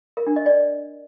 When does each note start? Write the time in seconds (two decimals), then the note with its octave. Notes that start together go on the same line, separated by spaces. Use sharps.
0.17 A#4
0.27 D4
0.36 D#5
0.46 D5